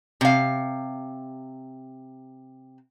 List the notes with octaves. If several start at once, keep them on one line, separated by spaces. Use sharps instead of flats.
C3 F5